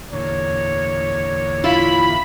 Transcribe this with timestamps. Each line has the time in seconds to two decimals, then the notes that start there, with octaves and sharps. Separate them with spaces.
0.12 E2 A#2 D3 C#5
1.64 E4 F4 B5